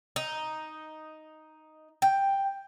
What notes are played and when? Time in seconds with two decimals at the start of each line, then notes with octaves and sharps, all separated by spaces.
0.16 D#4
2.02 G5